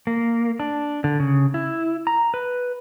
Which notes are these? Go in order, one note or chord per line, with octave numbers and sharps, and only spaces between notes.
A#3
D4
D3
C#3
E4
A#5
B4